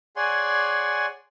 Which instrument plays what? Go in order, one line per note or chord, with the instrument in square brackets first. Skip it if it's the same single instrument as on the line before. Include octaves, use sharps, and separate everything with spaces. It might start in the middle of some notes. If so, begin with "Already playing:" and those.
[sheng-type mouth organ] G#4 C#5 D5 F#5 G#5 C6